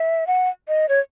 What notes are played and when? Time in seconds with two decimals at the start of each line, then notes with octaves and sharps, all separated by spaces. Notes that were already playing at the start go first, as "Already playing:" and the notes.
Already playing: E5
0.27 F#5
0.68 D#5
0.89 C#5